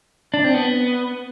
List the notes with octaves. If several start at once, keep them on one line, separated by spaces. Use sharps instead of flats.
D4
C4
B3